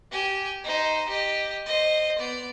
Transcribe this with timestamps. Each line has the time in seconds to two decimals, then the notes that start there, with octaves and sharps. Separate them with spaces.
0.12 G4 G#5
0.64 D#4 C5
1.09 G4 D#5
1.66 C5 D#5
2.19 B3 D5